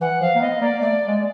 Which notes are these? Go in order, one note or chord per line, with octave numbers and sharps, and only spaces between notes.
E3 F#5
F3 F5
A#3
B3 D#5
A#3 D5
A3 D5
G#3